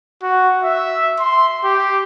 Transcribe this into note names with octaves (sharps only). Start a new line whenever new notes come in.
F#4
E5
C6
G4